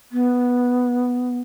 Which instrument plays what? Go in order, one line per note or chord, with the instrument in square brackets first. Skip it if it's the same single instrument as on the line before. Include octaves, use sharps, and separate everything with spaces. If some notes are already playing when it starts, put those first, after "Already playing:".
[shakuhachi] B3